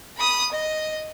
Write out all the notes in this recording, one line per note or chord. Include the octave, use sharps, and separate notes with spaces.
B5 D#6
D#5